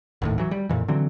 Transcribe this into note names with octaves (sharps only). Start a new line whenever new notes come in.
G#1 D#2 A2
E3 F#3
G3
F2 A#2 E3
D3 E3 F#3 C4